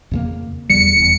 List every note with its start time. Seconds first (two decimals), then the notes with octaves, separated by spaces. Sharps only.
0.11 F2 C#3 A#3
0.70 E2 C#3 G3 C#7
0.95 E1 E2